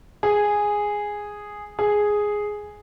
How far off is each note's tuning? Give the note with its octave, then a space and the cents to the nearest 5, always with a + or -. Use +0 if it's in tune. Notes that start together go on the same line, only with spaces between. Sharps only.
G#4 -5
G#4 +0